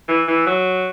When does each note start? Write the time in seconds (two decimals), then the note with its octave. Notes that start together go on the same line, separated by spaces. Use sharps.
0.08 E3
0.28 E3
0.47 F#3